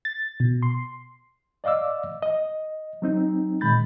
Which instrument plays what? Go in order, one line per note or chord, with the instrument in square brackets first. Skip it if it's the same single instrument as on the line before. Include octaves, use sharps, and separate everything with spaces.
[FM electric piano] A6
B2
C6
[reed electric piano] D5 D#5 F5 D6 E6
D#5
F#3 C4 D#4
A#2 D#3 G#3 B5 G6 A6